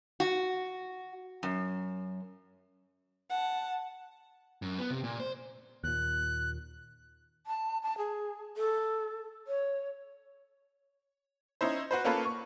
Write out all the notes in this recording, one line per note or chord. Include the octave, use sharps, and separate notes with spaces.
F#4
F#2
F#5 A5
F#2
B3
C3
A#2
C5
D#2 A#2 F#6
A5
A5
G#4
A4
C#5
C#4 D#4 E4 C5
F#4 B4 C5
A#3 C#4 F4 A4 B4
C#6